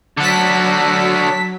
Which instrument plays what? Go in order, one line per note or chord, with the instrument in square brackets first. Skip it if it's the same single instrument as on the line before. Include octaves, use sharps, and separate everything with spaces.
[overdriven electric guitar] D3 F#4 [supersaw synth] F#3 [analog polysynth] A5 B6